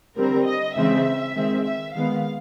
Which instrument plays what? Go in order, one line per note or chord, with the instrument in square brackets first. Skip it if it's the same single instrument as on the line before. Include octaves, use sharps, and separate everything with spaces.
[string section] D3 G3 C4 A#4
D#5
C#3 E3 G#3 C4 E5
D#3 G#3 C4
E5
D#3 G#3 B3 F5